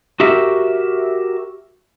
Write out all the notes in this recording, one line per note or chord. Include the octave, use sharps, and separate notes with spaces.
F#4 G4 A#4 E5